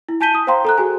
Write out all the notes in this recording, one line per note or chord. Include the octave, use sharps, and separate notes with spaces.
E4
G#5 A5 G6 B6 D#7 G7
D#6
C5 F5 G5 A#5 C6
A4 A#5 F#6
F#4 G#4 G#5